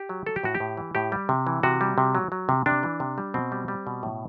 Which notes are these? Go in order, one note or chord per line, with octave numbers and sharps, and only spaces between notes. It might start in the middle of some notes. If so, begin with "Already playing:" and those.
Already playing: G4
F#3
F#3 A4
G4
A2 F#4
G4
A2
E3
A2 G4
G3
C3
E3
C3 F#4
G3
C3
F#3
F#3
C3
C3 D4
E3
C3
G3
B2 C4
G3
G3
B2
A2